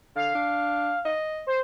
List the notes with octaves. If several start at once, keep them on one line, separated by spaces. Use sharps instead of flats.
D3 F5
D4
D#5
C5